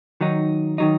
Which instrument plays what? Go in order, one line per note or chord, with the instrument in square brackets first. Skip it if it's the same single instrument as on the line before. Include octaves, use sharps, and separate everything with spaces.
[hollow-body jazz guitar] D#3 F#3 D#4
D#3 F#3 D#4